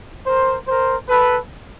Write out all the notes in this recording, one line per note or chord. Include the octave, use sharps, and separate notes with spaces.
A#4 C5
A#4 C5
A4 B4